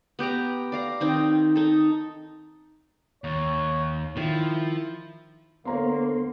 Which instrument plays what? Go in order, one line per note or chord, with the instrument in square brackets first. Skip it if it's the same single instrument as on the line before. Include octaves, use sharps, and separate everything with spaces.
[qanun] B3 G4 G5 A#5
D5 F5 A#5
D#3 C4 D#4
D#4 A4
[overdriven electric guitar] D#2 [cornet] C#5
[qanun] D#3 [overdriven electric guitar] F3 [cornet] E4
[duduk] D3 [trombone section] A#3 [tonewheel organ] B3 C5 [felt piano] C#5 A#5 C6